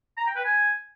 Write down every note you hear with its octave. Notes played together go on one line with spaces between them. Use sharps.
A#5
G5
B4
G#5